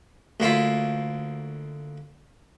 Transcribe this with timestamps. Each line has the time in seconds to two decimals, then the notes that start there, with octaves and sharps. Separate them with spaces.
0.40 D2 A#3 E4 F4